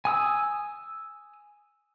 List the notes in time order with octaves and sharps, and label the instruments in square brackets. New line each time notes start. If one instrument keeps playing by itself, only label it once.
[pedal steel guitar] G#5 D#6 E6